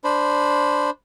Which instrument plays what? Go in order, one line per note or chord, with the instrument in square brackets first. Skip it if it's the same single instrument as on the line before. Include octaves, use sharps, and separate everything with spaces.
[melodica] D4 C5 B5